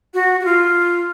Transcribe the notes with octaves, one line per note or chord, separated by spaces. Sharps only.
F#4
F#4
F4